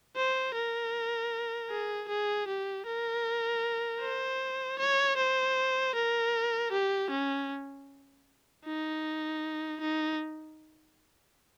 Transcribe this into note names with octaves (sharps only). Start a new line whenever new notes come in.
C5
A#4
G#4
G#4
G4
A#4
C5
C#5
C5
A#4
G4
C#4
D#4
D#4